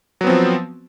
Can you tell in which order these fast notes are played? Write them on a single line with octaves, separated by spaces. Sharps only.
F#3 B3 C4 F3